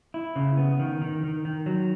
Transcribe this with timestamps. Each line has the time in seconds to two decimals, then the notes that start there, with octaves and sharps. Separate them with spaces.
0.14 E4
0.36 C#3
0.57 B3
0.79 D#3
1.02 D#3
1.23 D#3
1.45 D#3
1.66 F#3